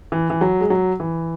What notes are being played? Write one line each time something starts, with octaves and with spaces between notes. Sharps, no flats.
E3
E3
F#3
G#3
F#3
E3